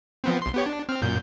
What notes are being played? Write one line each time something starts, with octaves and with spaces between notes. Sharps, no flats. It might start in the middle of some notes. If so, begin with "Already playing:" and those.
F3 B3 C4
B1 C6
B3 G4 C#5
D4
C4 F6
F#2 A#2 G6